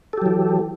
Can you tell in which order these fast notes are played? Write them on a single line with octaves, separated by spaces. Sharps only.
A4 G4 F#3 E3